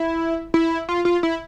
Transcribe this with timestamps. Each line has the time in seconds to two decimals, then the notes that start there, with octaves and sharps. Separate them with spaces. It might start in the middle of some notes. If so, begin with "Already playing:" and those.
Already playing: E4
0.54 E4
0.89 F4
1.05 F4
1.23 E4